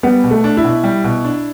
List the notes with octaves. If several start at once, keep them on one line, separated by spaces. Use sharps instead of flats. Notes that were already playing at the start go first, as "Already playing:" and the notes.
G3 B3
B2
A3
D4
E4
B2
G3
B2
D4